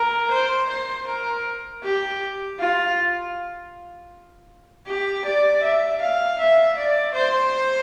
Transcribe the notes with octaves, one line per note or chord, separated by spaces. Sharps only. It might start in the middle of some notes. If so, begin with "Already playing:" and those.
Already playing: A#4
C5
C5
A#4
G4
F4
G4
D5
E5
F5
E5
D5
C5